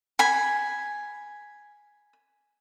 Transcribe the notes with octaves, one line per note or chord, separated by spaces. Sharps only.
G#5 B5